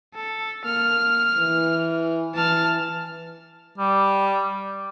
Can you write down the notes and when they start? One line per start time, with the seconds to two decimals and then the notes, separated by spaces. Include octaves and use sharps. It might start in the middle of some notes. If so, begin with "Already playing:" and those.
0.15 A4
0.65 A#3 F6
1.37 E3
2.35 E3 A5 F6
3.78 G3